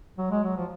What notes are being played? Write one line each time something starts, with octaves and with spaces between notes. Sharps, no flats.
F#3
G#3
F#3
F3